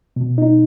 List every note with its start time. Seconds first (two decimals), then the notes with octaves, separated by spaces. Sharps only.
0.16 B2
0.38 D#4